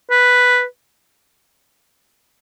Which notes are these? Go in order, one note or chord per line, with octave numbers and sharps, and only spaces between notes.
B4